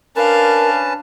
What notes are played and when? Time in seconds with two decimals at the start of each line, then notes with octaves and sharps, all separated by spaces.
0.16 C#4 D4 A#4 B4 F5 A5